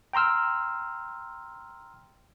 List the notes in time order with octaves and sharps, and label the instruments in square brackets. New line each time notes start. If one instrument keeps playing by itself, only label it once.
[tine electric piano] G5 A#5 C6 E6 F6